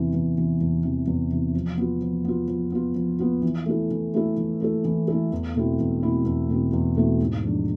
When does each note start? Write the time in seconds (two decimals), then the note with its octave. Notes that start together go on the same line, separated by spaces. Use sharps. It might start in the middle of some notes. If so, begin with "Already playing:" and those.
Already playing: E2 C3 E3
0.13 E2
0.37 C3 E3
0.61 E2
0.84 C3 E3
1.07 E2
1.31 C3 E3
1.55 F3
1.77 B3 F4
2.02 F3
2.24 B3 F4
2.48 F3
2.72 B3 F4
2.95 F3
3.19 B3 F4
3.42 E3
3.66 A3 E4 A4
3.91 E3
4.14 A3 E4 A4
4.37 E3
4.61 A3 E4 A4
4.85 E3
5.08 A3 E4 A4
5.32 E2
5.56 B2 A3 C4 E4
5.79 E2
6.03 B2 A3 C4 E4
6.25 E2
6.49 B2 A3 C4 E4
6.73 E2
6.96 B2 A3 C4 E4
7.20 G#2
7.43 F3 G#3 D4